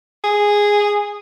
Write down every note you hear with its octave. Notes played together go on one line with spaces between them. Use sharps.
G#4